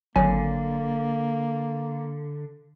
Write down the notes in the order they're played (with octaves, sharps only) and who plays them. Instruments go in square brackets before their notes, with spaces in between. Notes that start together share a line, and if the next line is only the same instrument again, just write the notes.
[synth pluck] G#1 F#3 G#5 [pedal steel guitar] D3 [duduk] A#3